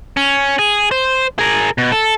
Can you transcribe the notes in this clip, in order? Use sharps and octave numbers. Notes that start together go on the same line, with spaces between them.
C#4
G#4
C5
G#4 A#4
B2
A4